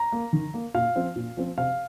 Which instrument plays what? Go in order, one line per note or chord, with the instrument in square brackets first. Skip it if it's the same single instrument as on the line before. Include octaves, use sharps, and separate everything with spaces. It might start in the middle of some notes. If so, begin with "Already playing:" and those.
Already playing: [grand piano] A#5
A#3
D#3
A#3
A#2 F5
F3 C4
A#2
F3 C4
C3 F5